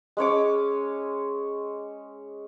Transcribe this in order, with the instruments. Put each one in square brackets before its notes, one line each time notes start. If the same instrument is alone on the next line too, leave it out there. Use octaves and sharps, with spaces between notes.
[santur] G#3 C#4 C#5 D6